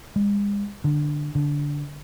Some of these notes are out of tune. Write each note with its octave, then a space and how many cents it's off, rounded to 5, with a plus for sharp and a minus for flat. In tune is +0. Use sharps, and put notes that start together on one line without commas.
G#3 -40
D3 +10
D3 -15